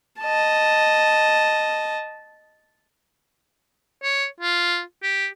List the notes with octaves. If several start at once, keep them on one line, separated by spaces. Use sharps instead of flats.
D#5 A5
C#5
F4
G4